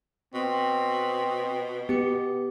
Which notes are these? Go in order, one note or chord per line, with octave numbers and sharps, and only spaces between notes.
B2 C4
B3 G4 C#7